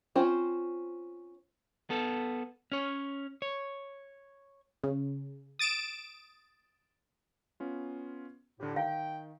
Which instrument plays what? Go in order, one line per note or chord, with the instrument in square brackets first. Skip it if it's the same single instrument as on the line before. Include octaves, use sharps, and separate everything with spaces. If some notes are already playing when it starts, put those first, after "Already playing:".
[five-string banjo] C4 C#4 F4 C5
[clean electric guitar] B3 A4
C#4 C#5
C#5
[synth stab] C#3
D#6 A6 D7 E7
[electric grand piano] B3 C#4 F4
[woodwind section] A2 [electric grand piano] D3 G4
[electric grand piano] D#3 [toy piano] F5 [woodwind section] G5